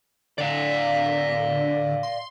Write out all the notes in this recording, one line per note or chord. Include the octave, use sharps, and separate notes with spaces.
D3 D5 F5
C6